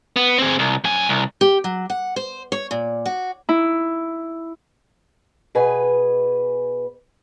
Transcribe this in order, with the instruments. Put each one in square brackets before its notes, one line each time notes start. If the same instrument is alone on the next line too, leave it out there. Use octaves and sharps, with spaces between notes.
[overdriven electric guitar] B3
C4 G#4
C2
F#2 G#5
C2
[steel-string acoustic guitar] G4
F#3
F#5
C5
C#5
A#2
F#4
[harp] E4
[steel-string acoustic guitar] B2 G#4 B4 G#5